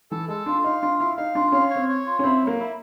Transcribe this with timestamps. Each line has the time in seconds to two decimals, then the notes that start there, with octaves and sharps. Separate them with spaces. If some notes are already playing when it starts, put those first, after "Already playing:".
0.11 E3 A4
0.28 G#3 A4
0.46 D4 F4
0.64 D#4 F5
0.82 D4 F4
1.00 E4 F5
1.17 D#4 F5
1.35 D4 F4
1.52 C#4 F5
1.70 C#5
1.76 C4
1.89 C#5
2.06 F4
2.19 C#4
2.24 C4 E4
2.42 F#3
2.47 A#3
2.59 E4